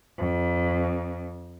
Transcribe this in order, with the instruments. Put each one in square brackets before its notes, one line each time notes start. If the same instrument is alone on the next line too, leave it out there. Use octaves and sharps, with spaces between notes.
[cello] F2